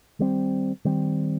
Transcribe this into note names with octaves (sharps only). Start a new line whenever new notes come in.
D#3 G3 C4
D#3 G3 C4